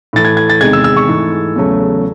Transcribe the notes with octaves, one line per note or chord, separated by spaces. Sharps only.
A2 E3 A3 A6
G#6
G#6
A6
E2 C3 D#3 G#3 G#6
E6
E6
C#6
G#2 E3 A3
E2 C#3 F#3 A3